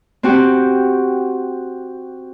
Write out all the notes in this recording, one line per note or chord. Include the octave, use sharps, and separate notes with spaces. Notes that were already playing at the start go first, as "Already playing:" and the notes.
C4 F#4 G4